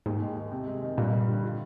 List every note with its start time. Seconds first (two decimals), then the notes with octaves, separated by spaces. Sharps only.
0.06 D#2 G#2
0.22 G#3
0.37 D#3
0.52 C3
0.67 G#3
0.82 D#3
0.98 G2 A#2
1.13 G3
1.28 D3
1.43 F4